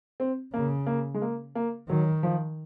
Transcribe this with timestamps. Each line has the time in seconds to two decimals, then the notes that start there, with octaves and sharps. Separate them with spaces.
0.20 C4
0.53 C#3 A#3
0.86 A#3
1.14 G#3
1.22 A#3
1.55 A#3
1.89 D#3 F#3
2.23 F3